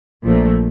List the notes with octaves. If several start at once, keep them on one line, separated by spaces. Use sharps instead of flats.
A#1 A#2 F3 A3